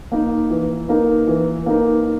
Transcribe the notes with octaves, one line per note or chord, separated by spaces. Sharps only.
A#3 D#4 A#4
E3
A#3 D#4 A#4
E3
A#3 D#4 A#4